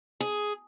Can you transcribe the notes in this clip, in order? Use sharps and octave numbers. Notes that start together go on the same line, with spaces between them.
G#4